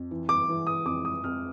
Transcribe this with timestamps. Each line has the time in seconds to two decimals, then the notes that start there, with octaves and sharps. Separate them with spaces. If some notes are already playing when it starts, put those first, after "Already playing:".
Already playing: F2
0.11 E3
0.29 D6
0.49 E3
0.67 D#6
0.85 F2 D6
1.05 D#6
1.24 F2 F6